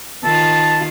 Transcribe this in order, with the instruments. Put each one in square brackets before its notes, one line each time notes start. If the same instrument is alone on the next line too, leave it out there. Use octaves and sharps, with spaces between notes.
[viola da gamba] D#3 F4 [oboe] A5